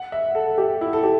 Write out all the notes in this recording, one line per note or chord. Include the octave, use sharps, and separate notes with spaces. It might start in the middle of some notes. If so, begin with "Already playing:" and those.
Already playing: F#5
E5
A4
G4
E4
A4
G4